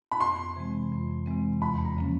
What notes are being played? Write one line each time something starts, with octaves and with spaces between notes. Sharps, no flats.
B5
F2 C6
C3 E3 G#3 C4
F2
C3 E3 G#3 C4
E2 B5
A#5
C#3 F3 A#3 C#4